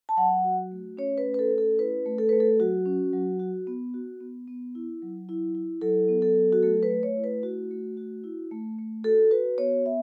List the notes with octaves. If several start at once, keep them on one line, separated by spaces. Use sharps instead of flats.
A5
F#3 F#5
F#4
A3
C#4 C#5
B4
A3
B4
A4
C#4
A4
E4 B4
A3
A4
A3 B4
A4
F#3 F#4
C#4
F#3
F#4
B3
F#4
B3
B3
E4
F#3
E4
E4
F#3 A4
B3
A4
F#3
F#4
A3 A4
B4
A3
C#5
E4
B4
A3 F#4
A3
F#4
E4
A3
A3
F#4 A4
F#4 B4
B3 C#5
B3 E5